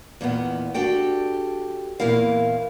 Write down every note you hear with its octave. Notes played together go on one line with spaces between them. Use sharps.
E2 A#2 D#3 B3
D4 F#4 G4 A4 G5
E2 A#2 A#3 E4 F5